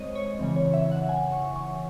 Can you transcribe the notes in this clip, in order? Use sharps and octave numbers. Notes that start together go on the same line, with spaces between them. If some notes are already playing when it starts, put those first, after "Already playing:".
Already playing: G#3 C4 C5 C#5 D#5
C#5
C#3 E3 C4
C#5
E5
F#5
G#5
C#6
C#6